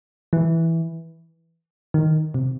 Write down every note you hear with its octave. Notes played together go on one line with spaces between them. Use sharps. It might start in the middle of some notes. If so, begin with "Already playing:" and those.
E3
D#3
C3